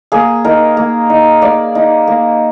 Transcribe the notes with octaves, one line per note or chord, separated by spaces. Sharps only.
A#3 G#4
D#4 A#4
A#3
D#4
A#3 D5
D#4
A#3